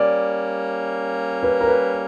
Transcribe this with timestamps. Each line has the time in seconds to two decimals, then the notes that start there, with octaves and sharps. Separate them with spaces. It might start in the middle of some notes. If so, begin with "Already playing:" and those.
Already playing: G3 A#3 C#4 D5
1.43 B4
1.61 A#4
1.68 B4